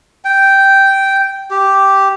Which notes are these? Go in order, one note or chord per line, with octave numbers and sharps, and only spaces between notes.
G5
G4